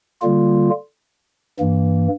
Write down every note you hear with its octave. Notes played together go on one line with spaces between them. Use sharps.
D3 G3 A#3 F4
G2 E3 A#3